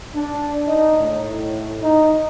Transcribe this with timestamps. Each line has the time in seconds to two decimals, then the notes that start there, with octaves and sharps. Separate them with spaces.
0.15 D4
0.67 D#4
1.00 A2
1.82 D#4